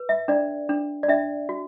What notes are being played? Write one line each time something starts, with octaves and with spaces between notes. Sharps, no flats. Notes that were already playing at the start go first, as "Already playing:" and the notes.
Already playing: B4
E5
D4 D5
D4
D5
D4 E5
F#4